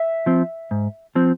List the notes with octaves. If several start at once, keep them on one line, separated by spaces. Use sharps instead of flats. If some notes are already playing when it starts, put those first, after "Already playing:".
Already playing: E5
F3 C4
G#2
F3 C4